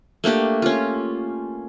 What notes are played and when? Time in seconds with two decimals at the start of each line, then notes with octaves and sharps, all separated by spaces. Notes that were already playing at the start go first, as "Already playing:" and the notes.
0.24 A3 A#3 D4 G4
0.62 C#4 F4